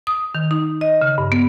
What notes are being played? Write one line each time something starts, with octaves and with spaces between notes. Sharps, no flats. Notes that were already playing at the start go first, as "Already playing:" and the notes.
D#6
D#3
D#4
D#5
C#3
G2
B3